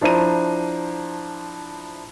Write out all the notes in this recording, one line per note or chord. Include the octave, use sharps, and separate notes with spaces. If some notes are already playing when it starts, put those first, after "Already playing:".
F3 D4 E4 C5 A#5 D#7